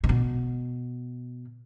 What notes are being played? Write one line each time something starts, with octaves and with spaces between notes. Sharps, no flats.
C3
B2